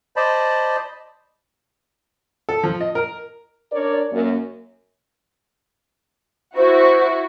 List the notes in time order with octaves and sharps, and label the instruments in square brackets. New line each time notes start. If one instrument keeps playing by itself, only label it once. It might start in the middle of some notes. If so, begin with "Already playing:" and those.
[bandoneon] C5 D5 D#5 A5 B5
[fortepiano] A4
F3
D#5
A#4
[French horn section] D4 A#4 C#5 D5
F#2 A#3
[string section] E4 F#4 [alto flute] C5